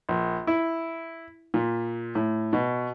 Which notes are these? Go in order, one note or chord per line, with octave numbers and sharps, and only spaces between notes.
A#1
E4
A#2
A2
B2